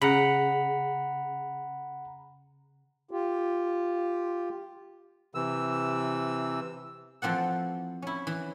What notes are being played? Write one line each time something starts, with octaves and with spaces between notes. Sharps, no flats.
C#3 F#5 A#5 B5
F4 G4
C3 E3 E6
E3 F3 C4 A4 F#5
C#4 E4
E3